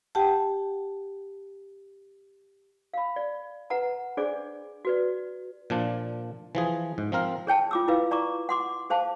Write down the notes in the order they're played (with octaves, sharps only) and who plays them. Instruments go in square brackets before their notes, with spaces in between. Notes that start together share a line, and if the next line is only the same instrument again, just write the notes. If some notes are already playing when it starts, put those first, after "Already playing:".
[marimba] G4 F#5 G5 A5
[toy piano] F5 B5
D5
B4 F#5 A#5
D4 G#4 C5 D5 D6
F#4 B4 D5
[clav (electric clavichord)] A#2 F3 D4
E3 F3 G#4
G#2
F3 C4 A#4 F5
[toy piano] G#4 C#5 G5 A5
F4 D6 E6
E4 F4 B4 F5
D5 A#5 C#6 D6
F#5 C6 D6
G#4 C5 F5 A5